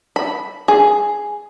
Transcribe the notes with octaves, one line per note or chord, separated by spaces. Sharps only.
B5
G#4